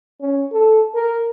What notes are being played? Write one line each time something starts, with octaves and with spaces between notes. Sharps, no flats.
C#4
A4
A#4